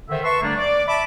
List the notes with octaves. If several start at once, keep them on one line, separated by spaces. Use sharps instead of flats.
D3 D#3 C5 E5
B4 E5 A5 C6 C#6
D3 G3 A3 A#3 D4
D5
E5 A5 B5 D6